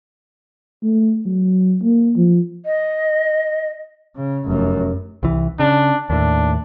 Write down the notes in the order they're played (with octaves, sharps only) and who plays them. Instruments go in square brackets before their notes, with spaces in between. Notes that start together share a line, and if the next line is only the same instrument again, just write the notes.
[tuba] A3
F#3
A#3
F3
[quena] D#5
[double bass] C#3
F1 F#2
[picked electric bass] C2 E3
[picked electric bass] C#3 [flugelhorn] D4
[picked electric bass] D#2 A2 [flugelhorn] D4